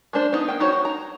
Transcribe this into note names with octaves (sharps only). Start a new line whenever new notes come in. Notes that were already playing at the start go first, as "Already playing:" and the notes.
G#3 A#3 D4 C5
B3 D#4
A#3 G5
D#4 F#4 C5 C#5
F#4
A#5